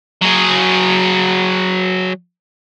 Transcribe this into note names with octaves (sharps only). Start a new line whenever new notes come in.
F#3 G#4